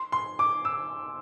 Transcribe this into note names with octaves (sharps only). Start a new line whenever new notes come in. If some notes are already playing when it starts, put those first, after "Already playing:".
Already playing: C6
C6
D6
E6